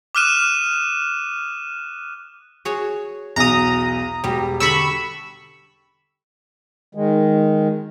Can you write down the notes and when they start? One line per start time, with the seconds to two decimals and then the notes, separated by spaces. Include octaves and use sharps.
0.15 D6 D#6 F6 F#6 D#7 E7
2.65 F#4 G#4 C#5
3.36 B1 E2 A#5 D#6
4.24 E1 G3 G4
4.60 D3 G3 B5 C#6 E6
6.95 D#3 G#3